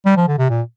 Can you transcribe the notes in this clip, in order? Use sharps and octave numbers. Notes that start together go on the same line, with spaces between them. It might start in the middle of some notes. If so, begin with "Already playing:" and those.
G3
F3
D3
C3
A#2